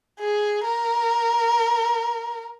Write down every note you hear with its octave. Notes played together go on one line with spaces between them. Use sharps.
G#4
A#4